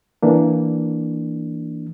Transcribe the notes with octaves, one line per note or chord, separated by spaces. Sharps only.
E3 A#3 D4